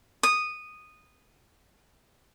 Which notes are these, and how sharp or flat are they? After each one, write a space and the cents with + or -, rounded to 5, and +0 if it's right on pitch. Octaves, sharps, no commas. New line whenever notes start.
D#6 -10